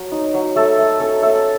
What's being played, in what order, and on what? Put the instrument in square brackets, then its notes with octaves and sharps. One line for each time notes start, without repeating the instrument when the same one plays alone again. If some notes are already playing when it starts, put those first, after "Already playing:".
Already playing: [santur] F#3
D#4
F#3
A3 A4
A3
C#4 A4
A3 A4